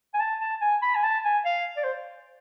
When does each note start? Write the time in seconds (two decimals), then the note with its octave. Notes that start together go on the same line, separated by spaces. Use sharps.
0.14 G#5
0.20 A5
0.41 A5
0.61 G#5
0.82 B5
0.95 G#5
1.03 A5
1.24 G#5
1.45 F5
1.77 D5
1.84 C5